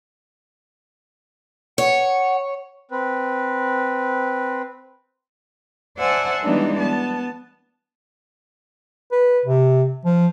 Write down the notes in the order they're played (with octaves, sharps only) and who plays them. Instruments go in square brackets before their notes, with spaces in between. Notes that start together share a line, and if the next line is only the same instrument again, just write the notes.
[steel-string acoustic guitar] C#5 [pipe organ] F#5
[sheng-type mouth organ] C4 B4
[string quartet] C5 D5 E5 F#5 G#5 A5
E3 G3 G#3 B3 D4 D#4
B3 A5
[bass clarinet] B4
C3
F3